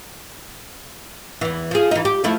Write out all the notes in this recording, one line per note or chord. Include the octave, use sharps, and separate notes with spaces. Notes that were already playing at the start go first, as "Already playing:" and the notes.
E2 E3
F3 G#4
E3 D#4
G4
F3 A3 E4